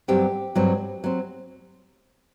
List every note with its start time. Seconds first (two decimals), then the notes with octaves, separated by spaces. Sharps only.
0.08 G2 F#3 C4 G4
0.56 G2 F#3 C4
1.04 F#3 C4